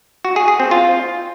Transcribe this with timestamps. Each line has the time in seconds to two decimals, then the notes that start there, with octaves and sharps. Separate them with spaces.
0.25 F#4
0.36 G#4
0.48 G#4
0.60 C4
0.71 F4